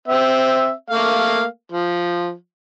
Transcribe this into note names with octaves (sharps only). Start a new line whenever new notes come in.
C4 E5
A3 A#3 F5
F3